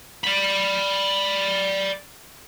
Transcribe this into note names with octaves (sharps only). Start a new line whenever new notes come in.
D5 B5